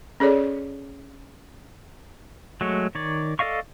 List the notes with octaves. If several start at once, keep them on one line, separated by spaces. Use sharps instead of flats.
C#4 G#4 A4 C#5 D5
F#3 G#3 A3 C#5
D#3 C#5 D5
A4 D5 D#5 F5 C#6